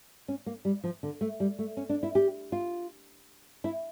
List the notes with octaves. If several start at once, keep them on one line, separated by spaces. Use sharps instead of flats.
C#4
A#3
G3
F3
D3
A3
G3
A3
C#4
D4
E4
G4
F4
E4